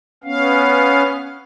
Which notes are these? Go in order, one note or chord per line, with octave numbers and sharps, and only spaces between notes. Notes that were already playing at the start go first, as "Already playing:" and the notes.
B3 C#4 F5